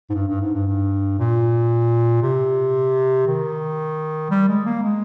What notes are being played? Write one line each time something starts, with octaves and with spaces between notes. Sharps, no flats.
G#2
G2
G2
G#2
G2
G2
A#2
C3
D#3
G3
G#3
A#3
G#3